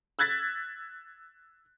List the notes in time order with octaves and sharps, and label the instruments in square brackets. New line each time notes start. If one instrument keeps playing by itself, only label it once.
[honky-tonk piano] E6 F#6 G#6 A6 B6